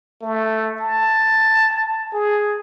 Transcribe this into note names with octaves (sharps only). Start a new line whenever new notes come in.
A3
A5
G#4